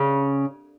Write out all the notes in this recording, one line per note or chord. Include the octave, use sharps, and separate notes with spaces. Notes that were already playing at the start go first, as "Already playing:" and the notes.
Already playing: C#3